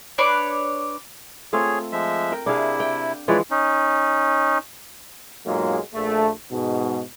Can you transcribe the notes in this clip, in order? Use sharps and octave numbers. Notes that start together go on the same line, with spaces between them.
D4 B4 C#5 D5
A3 C4 F4 G#4 C#5
F3 G#3 E5
A#4 G5
C3 D4 E4 G#4 F5
G5
E3 F3 G#3 B4 C#5 D5
C#4 D#4
B1 G#2 F#3 G#3 A#3 F4
A#1 A3
G#2 B2